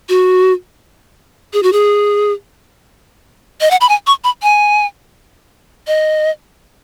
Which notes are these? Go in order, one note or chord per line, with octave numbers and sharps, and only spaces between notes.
F#4
G#4
F#4
G#4
D#5
F#5
B5
G#5
C#6
B5
G#5
D#5